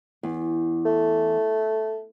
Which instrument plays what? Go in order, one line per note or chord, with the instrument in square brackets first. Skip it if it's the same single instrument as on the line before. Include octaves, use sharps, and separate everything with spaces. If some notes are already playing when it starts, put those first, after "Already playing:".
[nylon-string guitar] E2
[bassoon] A3